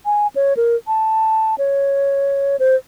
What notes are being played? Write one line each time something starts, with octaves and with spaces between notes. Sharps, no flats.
G#5
C#5
A#4
A5
C#5
C5